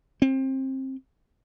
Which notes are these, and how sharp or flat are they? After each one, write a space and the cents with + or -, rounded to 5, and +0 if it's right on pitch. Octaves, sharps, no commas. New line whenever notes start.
C4 +25